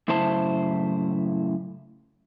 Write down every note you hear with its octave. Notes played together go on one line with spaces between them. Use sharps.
F#2 A2 C#3 E4 C5 A5